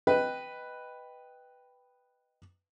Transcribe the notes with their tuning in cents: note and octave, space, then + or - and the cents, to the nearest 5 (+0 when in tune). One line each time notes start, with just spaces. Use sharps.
B4 +0 D#5 +0 G5 +0